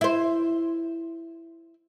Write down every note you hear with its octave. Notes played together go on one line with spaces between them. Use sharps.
E4 C5